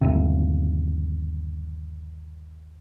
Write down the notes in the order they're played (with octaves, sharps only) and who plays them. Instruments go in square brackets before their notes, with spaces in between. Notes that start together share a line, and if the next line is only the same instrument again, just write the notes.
[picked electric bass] G1 D#2 C3